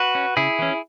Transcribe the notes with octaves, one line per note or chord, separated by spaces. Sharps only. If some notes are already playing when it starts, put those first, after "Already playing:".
Already playing: F#4 B4
C#4
C#3 E4 G#4
E3 C#4